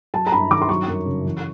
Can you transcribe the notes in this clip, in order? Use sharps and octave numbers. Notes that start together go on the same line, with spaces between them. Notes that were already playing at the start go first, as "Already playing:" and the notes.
F#3 A5
A#5
G2 B5
D#3 D6
C6
F#3 C#6
F#2
C#3
E3